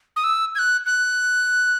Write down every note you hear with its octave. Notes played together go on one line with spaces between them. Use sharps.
D#6
E6
G#6
F#6
F#6